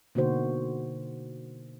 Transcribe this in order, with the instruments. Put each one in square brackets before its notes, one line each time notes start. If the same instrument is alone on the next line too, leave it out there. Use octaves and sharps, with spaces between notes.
[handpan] B2 D3 A#3 D#4 F#4 C5